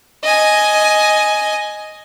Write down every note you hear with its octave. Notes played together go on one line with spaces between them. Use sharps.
D#5 G#5